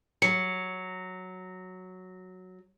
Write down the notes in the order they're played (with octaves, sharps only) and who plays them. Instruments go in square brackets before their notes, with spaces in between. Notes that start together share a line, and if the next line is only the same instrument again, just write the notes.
[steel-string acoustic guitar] F#3 [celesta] C#7